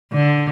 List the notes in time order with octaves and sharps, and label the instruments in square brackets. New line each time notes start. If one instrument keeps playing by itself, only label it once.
[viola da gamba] D3